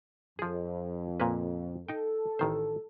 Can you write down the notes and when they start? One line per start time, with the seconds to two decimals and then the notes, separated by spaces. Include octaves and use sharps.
0.39 F2 F3 G#4
1.20 A#2 A#3 B4
1.88 D#4 A4 G5
2.39 A1 D#3 C5